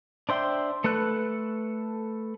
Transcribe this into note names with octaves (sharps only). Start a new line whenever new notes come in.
D4 C5 E5 G5 C6
A3 A4 B4 F#6